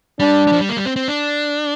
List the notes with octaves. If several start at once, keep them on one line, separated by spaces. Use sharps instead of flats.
G3 D4
G3
F3
G3
A#3
G3
C4
C4
D4